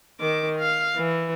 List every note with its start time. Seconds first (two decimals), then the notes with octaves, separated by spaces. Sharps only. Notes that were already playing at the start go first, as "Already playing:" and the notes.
0.20 D#3 D6
0.60 F5
0.97 E3